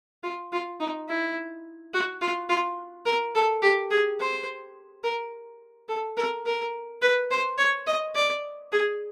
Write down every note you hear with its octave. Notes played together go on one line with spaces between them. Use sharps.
F4
F4
D#4
E4
F#4
F4
F4
A#4
A4
G4
G#4
C5
A#4
A4
A#4
A#4
B4
C5
C#5
D#5
D5
G#4